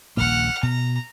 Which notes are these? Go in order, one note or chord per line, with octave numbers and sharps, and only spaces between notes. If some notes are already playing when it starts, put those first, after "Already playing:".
D#1 A#1 A#3 F#5 F6
B2 A#5